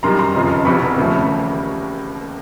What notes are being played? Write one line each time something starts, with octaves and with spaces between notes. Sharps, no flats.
F#2 D#3 G3 A#5 C6
A#5 C6
F1 F2 C#3 F3
E1 E2 C3 F3 B5 C#6
D#2 C#3 F3 A3